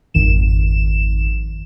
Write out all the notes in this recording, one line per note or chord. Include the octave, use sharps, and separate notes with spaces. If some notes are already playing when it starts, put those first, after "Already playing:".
G#1 F2 D#3 E7